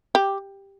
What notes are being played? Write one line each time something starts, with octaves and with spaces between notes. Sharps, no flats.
G4